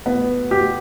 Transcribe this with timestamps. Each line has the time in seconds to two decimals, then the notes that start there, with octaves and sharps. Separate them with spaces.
0.06 B3
0.51 G4